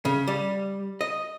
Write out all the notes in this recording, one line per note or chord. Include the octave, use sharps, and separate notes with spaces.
C#3
G3
D#5